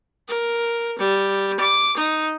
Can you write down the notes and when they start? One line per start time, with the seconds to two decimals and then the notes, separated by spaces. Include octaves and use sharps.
0.29 A#4
0.99 G3
1.60 D6
1.97 D#4